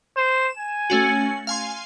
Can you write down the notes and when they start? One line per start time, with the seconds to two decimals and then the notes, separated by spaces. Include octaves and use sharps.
0.17 C5 E7
0.57 G#5
0.90 A3 C#4 F#4
1.47 F5 G#5 C6